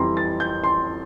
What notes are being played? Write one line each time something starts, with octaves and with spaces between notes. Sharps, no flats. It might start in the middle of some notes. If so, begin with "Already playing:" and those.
Already playing: F2 E3 G3 A#5 C6
A6
G6
C6